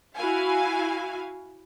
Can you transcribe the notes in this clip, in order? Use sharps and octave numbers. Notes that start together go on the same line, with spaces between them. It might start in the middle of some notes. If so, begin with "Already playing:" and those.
E4 F#4 F5 G#5